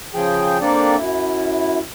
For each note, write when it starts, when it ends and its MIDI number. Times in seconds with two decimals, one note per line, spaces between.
0.14 0.58 49
0.14 0.58 53
0.14 0.58 68
0.14 0.58 79
0.61 0.95 58
0.61 0.95 60
0.61 0.95 62
0.61 0.95 69
0.61 0.95 74
0.97 1.79 42
0.97 1.79 64